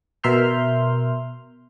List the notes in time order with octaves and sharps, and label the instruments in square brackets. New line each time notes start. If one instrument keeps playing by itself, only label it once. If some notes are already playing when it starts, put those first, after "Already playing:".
[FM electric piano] B2 A#4 E5 C6 F6 G6